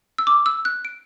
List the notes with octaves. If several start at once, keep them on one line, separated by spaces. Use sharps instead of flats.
E6
D6
E6
F#6
D7